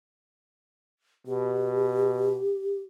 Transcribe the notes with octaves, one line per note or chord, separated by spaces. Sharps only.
B2 G4